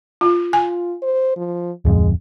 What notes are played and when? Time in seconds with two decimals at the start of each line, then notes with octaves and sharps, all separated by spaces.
0.21 F4
0.53 F4 G#5
1.02 C5
1.37 F3
1.85 D1 F2 G#3